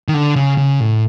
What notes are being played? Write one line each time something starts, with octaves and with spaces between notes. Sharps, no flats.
D#3
D3
C#3
C#3
A2